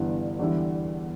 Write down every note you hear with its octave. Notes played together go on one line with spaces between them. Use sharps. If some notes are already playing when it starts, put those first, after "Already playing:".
Already playing: G1 G2 E3 B3 E4
E2 D3 G3 E4